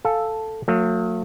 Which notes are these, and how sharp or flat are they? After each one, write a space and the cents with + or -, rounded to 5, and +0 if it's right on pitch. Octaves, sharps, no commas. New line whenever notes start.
A4 +0 F5 +0 G#5 +15
F#3 -35 A3 +40